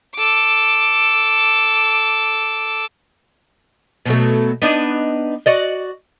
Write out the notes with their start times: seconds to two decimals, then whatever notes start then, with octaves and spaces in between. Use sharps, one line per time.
0.16 A4 D6
4.06 B2 F#3 A3
4.62 B3 D4 D#4
5.46 F#4 D5 D#5